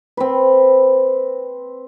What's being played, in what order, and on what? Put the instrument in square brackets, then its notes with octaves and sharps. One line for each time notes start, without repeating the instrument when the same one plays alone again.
[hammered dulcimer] C4 B4